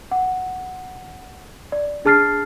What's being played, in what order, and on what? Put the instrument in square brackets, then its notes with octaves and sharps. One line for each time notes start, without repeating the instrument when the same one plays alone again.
[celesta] F#5
D5
D4 G#4 A5 F6 A6 C7